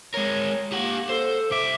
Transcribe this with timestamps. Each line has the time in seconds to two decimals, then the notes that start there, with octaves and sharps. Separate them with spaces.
0.14 G#3 A#4 C#5
0.72 A#3 G4 F#5
1.09 A4 C5
1.51 C2 E5 D6